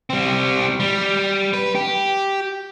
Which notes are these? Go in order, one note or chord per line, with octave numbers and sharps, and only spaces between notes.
G3 C4
G3
B4
G4